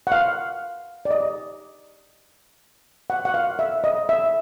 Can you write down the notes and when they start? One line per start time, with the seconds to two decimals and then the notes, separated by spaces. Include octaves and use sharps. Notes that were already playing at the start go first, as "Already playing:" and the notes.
0.07 F#5
0.12 F5
1.05 D5
1.11 D#5
3.10 F#5
3.25 F#5
3.34 F5
3.59 E5
3.84 D#5
4.09 E5